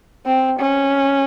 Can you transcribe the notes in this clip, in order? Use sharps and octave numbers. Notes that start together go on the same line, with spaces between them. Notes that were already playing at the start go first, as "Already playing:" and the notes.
C4
C#4